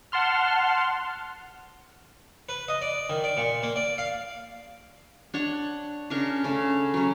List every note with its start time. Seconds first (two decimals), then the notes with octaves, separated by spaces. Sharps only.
0.12 F#5 A5 C6 F6
2.49 B4
2.68 D#5
2.82 D5
3.10 D#3
3.24 D5
3.37 A#2
3.63 A#3
3.76 D5
3.98 F5
5.34 D4 C#5 F#5
6.10 C#3 D4 A#4 C#6
6.44 C#3 A3
6.94 F#3 C#4